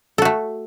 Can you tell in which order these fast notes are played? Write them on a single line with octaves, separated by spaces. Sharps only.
A4 F#4 A3